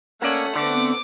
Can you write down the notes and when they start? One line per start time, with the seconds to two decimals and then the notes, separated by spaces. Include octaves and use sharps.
0.22 A3 A#3 C#4 A4 D5 F#5
0.55 D3 B3 C4 D6